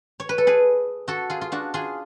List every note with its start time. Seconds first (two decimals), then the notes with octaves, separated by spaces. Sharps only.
0.20 C#5
0.29 B4
0.38 A4
0.47 G#4 B4
1.08 F#4 A4
1.30 F4 G#4
1.41 F4
1.52 D4 F#4
1.74 F4 G#4